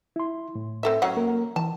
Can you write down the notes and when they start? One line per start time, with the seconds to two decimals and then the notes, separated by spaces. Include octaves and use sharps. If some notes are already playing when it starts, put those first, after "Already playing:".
0.16 E4 C6
0.55 A2
0.83 C4 A4 E5
1.02 F#3 C#4 F#5
1.17 A#3 A#4
1.56 E3 A5